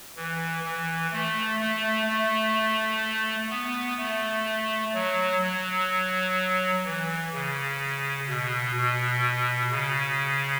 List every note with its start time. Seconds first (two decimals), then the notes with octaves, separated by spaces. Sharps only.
0.17 E3
0.64 E3
1.12 A3
1.60 A3
2.07 A3
3.51 B3
3.99 A3
4.94 F#3
5.42 F#3
6.85 E3
7.34 C#3
8.28 B2
8.76 B2
9.71 C#3